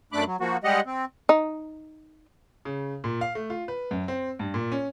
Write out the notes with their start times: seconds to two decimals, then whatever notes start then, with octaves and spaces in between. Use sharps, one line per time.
0.13 F#2 A3 D4 B5 D6 F#6
0.26 F#3
0.40 F3 A#3 F#4
0.64 G3 G#3 G4 D#5 F#5
0.86 C4
1.29 D#4
2.65 C#3
3.04 A#2
3.21 F5
3.35 A3
3.50 F4
3.68 B4
3.91 F#2
4.08 C4
4.39 G2
4.54 A#2
4.72 C#4